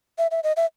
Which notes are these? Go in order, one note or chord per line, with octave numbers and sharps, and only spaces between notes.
E5
E5
D#5
E5